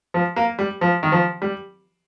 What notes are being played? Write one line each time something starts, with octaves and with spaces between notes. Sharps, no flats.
F3
A#3
G3
F3
D#3
F3
G3